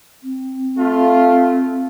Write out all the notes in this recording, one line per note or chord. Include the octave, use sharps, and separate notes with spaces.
C4
A3 F4